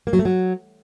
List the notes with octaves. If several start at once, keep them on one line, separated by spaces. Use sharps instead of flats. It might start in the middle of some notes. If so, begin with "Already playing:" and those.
A#3
F#3
A3
F#3